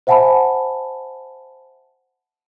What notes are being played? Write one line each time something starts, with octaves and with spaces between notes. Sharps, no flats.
C5 E5 F#5 G#5 A5 B5